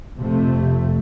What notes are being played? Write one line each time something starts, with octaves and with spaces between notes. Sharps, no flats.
F2 C3 A3